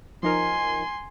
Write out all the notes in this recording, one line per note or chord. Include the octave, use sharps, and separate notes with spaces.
F3 D#4 A#4 G#5 C6